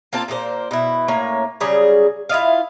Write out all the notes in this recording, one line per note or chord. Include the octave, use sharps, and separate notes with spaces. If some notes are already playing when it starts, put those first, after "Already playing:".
A#3 C4 F4 A5
A#2 A#3 G#4 C5
B2 E4
A2 A#3 C#4 C#5
C#3 F#3 G3 G#4
E4 F4 D#5 F5